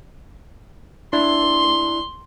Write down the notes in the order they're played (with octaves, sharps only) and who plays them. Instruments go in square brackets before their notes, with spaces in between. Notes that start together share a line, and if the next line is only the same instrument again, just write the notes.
[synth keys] D4 E4 [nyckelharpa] C6